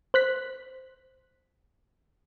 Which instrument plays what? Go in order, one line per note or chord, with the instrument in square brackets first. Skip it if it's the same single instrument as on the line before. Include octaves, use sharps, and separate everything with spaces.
[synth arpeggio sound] C5 F#6 B6